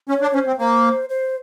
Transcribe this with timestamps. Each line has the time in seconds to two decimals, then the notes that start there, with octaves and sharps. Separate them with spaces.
0.09 C#4 C#5
0.22 D4
0.34 C#4 C5
0.47 C4
0.59 A#3 C5
1.09 C5